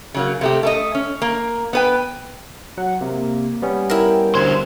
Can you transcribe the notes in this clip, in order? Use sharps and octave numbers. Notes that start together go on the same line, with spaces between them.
C#3 F#3 A#3
C3 A3 G4
A3 A4 D#5
C#4
A#3
B3 B4 G5
F#3 F#5
C3 A#3
G3 B3 C#4
E4 A#4 G5
D3 C5 G#6